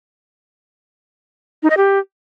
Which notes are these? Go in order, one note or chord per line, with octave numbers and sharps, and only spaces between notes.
D#4
D#5
G4